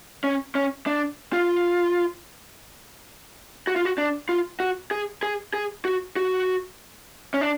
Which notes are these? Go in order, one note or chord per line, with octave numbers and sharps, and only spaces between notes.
C#4
C#4
D4
F4
F#4
F4
F#4
D4
F4
F#4
G#4
G#4
G#4
F#4
F#4
C#4
D4